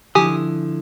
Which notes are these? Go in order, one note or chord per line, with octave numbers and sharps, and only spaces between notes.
D3 F3 E4 G4 G#5 D#6